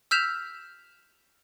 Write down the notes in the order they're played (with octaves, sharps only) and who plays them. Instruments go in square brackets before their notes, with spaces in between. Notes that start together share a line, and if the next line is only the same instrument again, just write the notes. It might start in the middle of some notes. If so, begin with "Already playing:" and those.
[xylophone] E6 F6 G6 B6 E7 F7